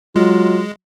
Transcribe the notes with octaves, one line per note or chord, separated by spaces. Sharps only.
F#3 G#3 F4